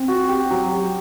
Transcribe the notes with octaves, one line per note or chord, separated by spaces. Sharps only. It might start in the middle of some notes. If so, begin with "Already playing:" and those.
Already playing: C4
F#4
G4
F#3
G4